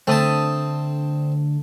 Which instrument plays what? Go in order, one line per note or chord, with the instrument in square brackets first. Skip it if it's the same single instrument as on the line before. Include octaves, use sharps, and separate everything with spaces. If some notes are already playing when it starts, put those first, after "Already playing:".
[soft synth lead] D3 [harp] A3 D#6 [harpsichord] C4 A5